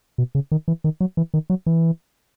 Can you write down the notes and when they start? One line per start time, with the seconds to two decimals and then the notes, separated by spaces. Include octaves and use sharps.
0.18 B2
0.35 C#3
0.52 D#3
0.68 E3
0.84 D#3
1.01 F#3
1.17 E3
1.34 D#3
1.50 F#3
1.66 E3